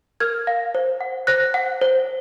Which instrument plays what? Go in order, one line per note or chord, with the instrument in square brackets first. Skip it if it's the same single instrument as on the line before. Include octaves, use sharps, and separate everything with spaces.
[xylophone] A#4 F6 G#6
F5
C5
F#5
C5 F#6 A#6
F#5
C5